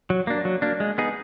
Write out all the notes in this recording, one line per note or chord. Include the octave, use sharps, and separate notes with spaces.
F#3
A#3 D4
F#3
A#3 D4
G#3
B3 D#4 G#4